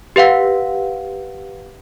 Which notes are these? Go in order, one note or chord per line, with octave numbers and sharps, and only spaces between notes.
G4 B4 F5 F#5